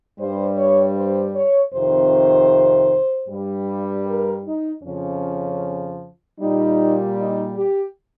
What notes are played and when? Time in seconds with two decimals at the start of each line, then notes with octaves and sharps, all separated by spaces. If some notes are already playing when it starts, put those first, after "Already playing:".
0.18 G2 G3 C5
0.57 C#5
0.95 C5
1.34 C#5
1.73 F2 C3 D#3 C5
3.28 G2 G3
4.06 A#4
4.45 D#4
4.83 F2 C#3 F3 C#4
6.40 A#2 G3 D#4
7.16 D#4
7.56 G4